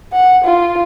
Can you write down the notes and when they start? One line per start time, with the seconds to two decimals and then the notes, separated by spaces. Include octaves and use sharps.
0.12 F#5
0.44 F4